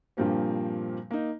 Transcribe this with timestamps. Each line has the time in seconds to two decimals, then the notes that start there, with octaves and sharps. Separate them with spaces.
0.17 G2 A#2 F3 G3 A#3 C4
1.11 A#3 D#4